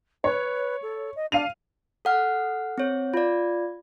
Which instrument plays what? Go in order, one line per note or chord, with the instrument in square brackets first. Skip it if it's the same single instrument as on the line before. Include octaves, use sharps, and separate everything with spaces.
[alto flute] B4 [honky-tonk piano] C#5
[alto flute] A4
D#5
[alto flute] D4 [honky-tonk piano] F5 D#7 F7
[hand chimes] A4 F#5 F6
C4 C#5
F4 D5